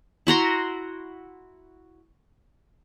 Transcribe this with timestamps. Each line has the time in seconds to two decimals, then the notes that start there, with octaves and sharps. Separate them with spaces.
0.27 E4 F#4 A#5 C6